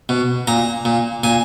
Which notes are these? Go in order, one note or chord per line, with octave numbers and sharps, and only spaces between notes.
B2
A#2 A#5
A#2
A#2 G#5